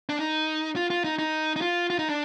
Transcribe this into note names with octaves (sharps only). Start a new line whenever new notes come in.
D4
D#4
F4
F4
D#4
D#4
D#4
F4
F4
D#4
D4